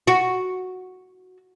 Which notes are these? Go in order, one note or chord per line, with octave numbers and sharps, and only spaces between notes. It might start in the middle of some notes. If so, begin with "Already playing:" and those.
F#4